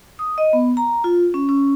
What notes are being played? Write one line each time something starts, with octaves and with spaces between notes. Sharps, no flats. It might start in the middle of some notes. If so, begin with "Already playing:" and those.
D#6
D#5
B3
A#5
F4
C#4
C#4